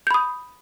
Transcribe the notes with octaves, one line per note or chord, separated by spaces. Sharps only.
B5 D#6 G6